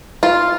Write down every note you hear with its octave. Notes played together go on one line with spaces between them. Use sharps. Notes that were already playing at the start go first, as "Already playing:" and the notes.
F4